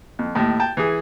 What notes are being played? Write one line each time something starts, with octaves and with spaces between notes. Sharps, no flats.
F2
D#2 A2
G5 A5
E3 G#4